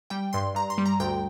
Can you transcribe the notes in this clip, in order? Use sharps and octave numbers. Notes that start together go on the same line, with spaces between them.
G3 G5
G2 C6
G2 A#5
C6
G3
A#5
D2 G5